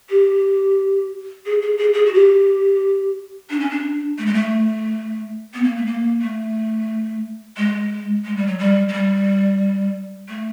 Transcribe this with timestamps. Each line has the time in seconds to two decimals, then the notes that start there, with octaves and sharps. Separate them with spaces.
0.10 G4
1.46 G#4
1.62 G#4
1.78 G#4
1.94 G#4
2.06 F#4
2.14 G4
3.50 D4
3.60 C#4
3.71 D4
4.18 A3
4.26 G#3
4.34 A3
5.54 B3
5.64 A#3
5.76 A3
5.86 A#3
6.22 A3
7.57 G#3
8.25 G#3
8.37 G3
8.47 F#3
8.59 G3
8.89 G#3
8.93 G3
10.29 A3